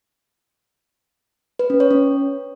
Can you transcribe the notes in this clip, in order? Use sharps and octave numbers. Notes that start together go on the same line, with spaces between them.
B4
C#4
C#5
C#4